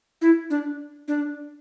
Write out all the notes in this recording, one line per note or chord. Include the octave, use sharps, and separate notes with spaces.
E4
D4
D4